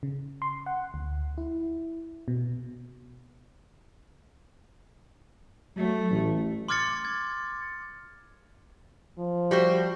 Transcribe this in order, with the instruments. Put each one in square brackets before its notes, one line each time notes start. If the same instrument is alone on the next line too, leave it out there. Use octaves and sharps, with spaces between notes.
[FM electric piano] C#3
C6
F#5
D2
E4
B2
[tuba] F#3 [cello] A3
[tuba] A1
[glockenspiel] C6 D6 F6 G#6 A6 C#7
G#6
[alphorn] F3
[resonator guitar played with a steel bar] G3 F#4 C5